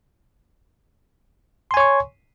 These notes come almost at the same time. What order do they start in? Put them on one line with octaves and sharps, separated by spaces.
C6 G#5 C#5 C#6